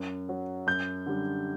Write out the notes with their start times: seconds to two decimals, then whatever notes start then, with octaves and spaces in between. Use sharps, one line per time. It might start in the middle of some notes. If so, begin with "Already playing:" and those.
Already playing: F#2
0.29 F#3
0.66 F#2 G6
1.06 D3 G3